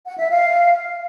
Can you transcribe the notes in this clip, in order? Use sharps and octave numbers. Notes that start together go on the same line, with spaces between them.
F#5
E5
F5